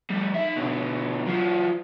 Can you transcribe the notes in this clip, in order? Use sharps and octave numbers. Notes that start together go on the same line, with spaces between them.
G3 A3
D#4 E5
B2 D3
F#3 F4